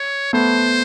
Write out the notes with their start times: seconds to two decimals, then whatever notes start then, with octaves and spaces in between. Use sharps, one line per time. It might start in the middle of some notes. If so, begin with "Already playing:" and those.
Already playing: C#5
0.33 A3 B3 C5